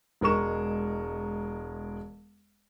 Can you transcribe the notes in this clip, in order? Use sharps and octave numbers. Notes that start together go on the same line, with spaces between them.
E1 G#3 A#4 C#6 E7